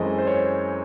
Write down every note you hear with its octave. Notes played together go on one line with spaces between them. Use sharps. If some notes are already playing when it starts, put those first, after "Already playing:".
Already playing: F#2 E3 G#3 C4 A4 D#5
C5
C#5
C5